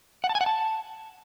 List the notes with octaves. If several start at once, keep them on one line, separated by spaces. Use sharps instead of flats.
F#5
A5
G#5
F#5
A5